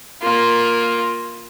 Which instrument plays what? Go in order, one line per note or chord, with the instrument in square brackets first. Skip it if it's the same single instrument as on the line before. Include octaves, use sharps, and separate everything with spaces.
[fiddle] A#3 F4